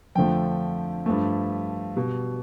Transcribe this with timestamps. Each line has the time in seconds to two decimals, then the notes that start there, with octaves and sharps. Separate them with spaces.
0.15 F2 D3 F3 A3 G5
1.06 G2 F3 A3
1.96 B2 G3